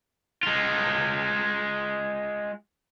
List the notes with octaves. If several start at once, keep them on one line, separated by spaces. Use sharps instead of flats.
G#3 F4